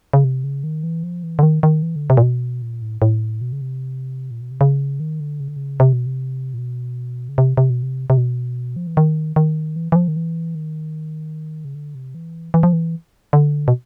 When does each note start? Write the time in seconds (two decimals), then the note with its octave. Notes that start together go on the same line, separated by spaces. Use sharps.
0.13 C#3
0.24 C3
0.44 C#3
0.64 D#3
0.83 E3
1.03 F3
1.23 E3
1.39 D3
1.43 D#3
1.63 D#3
1.83 E3
1.96 D3
2.10 C3
2.17 A#2
2.23 B2
2.62 A#2
2.82 A2
3.02 A2
3.41 B2
3.52 C#3
3.61 C3
4.31 A#2
4.41 B2
4.51 C3
4.61 C#3
5.00 D#3
5.20 D3
5.40 C#3
5.48 D3
5.56 C#3
5.80 C3
5.93 B2
6.06 C3
6.54 A#2
6.58 B2
7.29 C#3
7.38 C3
7.57 C3
7.70 B2
7.83 C3
8.10 C3
8.17 B2
8.76 F3
8.87 E3
8.97 D#3
9.36 D#3
9.76 E3
9.92 E3
9.96 F3
10.08 D#3
10.16 E3
10.55 D#3
11.65 C#3
11.75 D3
11.95 C3
12.15 E3
12.54 E3
12.63 F3
12.73 E3
13.33 D3
13.68 B2